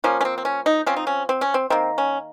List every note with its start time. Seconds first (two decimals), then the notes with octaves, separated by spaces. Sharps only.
0.04 F3 A#3 C#4
0.21 C#4
0.25 C4
0.38 C4
0.45 C#4
0.66 D#4
0.86 F3 C4 C#4
0.96 D#4
1.07 C#4
1.29 C4
1.41 C#4
1.54 C4
1.70 D#3 A#3 C4
1.98 C#4